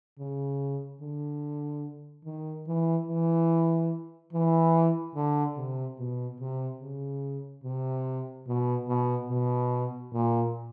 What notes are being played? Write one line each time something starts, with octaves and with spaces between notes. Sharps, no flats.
C#3
D3
D#3
E3
E3
E3
D3
C3
B2
C3
C#3
C3
B2
B2
B2
A#2